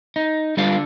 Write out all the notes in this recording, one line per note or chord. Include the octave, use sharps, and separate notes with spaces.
D#4
D3 G3 D4 F4